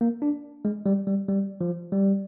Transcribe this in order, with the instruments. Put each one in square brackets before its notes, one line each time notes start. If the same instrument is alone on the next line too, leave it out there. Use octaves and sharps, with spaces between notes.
[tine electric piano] A#3
D4
G#3
G3
G3
G3
F3
G3